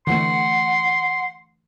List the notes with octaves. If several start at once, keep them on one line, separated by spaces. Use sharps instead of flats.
D3 E3 A3 F#5 C6